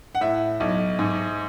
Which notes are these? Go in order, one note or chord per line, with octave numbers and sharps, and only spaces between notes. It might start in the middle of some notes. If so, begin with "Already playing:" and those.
F#5
A2 E5
B1
G#2